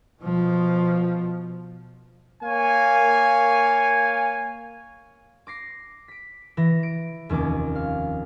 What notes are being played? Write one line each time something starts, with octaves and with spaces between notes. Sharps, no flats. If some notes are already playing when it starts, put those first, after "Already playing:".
B2 F3
A#3 C#5 F5 G#5
D6 A#6 C7
B6 D7
E3 A#6
D7
F1 D#2 C#4 D6
F5